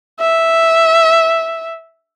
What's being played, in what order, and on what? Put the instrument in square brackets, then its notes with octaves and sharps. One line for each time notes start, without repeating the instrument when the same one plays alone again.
[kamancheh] E5